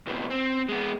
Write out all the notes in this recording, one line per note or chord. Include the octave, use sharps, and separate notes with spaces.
C#2 B2
C4
G#3 B3